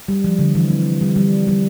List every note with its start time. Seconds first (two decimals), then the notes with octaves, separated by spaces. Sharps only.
0.08 G3
0.24 F3
0.39 D3
0.55 E3
0.70 C4
1.02 G3
1.16 G3
1.48 G3